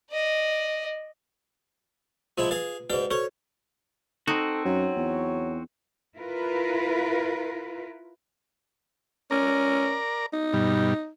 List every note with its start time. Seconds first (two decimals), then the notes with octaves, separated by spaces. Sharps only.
0.11 D5 D#5
2.38 F3 G#3 E4 F4
2.51 G#4 B4 F5
2.90 G#2 F#4 B4 D5 G5
3.10 F#4 A4 C5 C#5
4.28 C4 D#4 F#4 A4
4.65 F#2 F#3
4.97 E2
6.17 E4 F4 A#4 B4
9.31 C#4 A#4 D5 A#5
10.33 D#4
10.53 G2 B2 G3